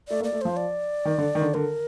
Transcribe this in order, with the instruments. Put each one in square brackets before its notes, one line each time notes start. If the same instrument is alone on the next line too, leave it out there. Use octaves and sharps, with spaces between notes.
[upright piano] A3 [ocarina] D5
[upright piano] A#3
[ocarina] D5
[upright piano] A3
[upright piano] F3 [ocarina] C5
[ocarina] D5
[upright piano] D#3
D3
D#3
D3
[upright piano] D3 [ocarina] A#4